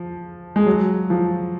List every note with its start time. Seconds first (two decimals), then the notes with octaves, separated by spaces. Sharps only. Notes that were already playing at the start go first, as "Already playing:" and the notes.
Already playing: F3
0.56 G#3
0.66 F#3
1.10 F3